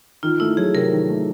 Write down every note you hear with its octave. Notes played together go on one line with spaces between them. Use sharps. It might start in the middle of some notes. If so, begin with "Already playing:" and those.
D#3 F4
A3 E4
F#3 G#4
C3 A#4
D#3
A3